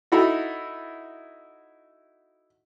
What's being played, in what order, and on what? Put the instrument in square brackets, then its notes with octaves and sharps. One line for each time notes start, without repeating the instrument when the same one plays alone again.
[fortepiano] D#4 E4 F#4 A4